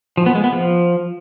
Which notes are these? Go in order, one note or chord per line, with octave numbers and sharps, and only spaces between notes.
F3
B3
G#3
B3
F3